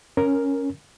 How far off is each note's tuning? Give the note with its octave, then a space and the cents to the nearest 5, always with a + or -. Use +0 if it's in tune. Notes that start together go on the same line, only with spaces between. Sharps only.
C#4 +0 A#4 +0